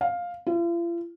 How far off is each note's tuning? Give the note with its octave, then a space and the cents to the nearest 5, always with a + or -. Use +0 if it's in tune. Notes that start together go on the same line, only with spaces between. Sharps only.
F5 +10
F4 -45